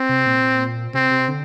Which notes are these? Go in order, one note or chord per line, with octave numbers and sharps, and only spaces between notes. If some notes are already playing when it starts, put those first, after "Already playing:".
Already playing: C4
C3
A#2
C3 C4
C3
D3